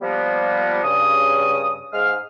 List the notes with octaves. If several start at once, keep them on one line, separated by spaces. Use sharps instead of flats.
F3 G3 A#3 B3
G2 C#3 D#6
G#2 G#3 F5 F6